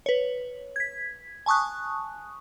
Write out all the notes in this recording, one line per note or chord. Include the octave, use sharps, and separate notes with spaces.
B4 C#5
G#6 B6
G#5 A5 C#6 D#6 F#6